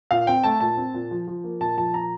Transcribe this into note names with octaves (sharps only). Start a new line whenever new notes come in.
A#2 F5
C4 G5
A3 A5
A#2 A5
C4
A#2
F3
F3
A#3
A#2 A5
F3 A5
A#2 A#5